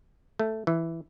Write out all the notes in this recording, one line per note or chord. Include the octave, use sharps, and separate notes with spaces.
A3
E3